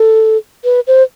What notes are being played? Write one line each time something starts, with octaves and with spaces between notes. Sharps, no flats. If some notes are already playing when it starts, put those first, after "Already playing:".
Already playing: A4
B4
C5